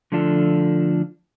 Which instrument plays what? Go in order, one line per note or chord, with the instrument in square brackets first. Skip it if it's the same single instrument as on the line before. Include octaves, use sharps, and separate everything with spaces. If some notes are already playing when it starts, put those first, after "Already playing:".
[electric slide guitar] D3 F3 A3 D4 F4 A4